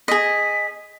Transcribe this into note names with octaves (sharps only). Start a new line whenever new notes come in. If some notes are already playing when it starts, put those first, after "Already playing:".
G#4 D#5 B6